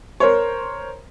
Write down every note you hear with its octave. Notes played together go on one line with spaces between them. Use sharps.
A#4 C5 C#5